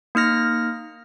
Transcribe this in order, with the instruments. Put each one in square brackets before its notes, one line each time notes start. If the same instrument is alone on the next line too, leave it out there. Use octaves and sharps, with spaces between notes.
[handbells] A#3 D#4 F6 A#6